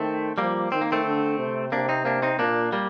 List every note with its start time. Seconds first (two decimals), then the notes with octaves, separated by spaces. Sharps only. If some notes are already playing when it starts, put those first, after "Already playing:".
Already playing: D#3 A3 C4
0.38 F3 G3 A#3
0.72 D#3 C4
0.81 A#3
0.92 A3 C4
1.05 D3
1.39 C3
1.72 C3 A#3 D4
1.89 C4 D#4
2.05 A#3 D4
2.22 C4 D#4
2.39 A#2 A#3 D4
2.72 G3 A#3